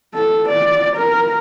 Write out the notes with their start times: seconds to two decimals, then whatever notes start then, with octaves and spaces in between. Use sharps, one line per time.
0.14 A4
0.49 D5
0.96 A#4